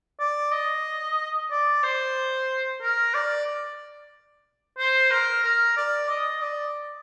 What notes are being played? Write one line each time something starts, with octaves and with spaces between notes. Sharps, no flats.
D5
D#5
D5
C5
A#4
D5
C5
A#4
A#4
D5
D#5
D5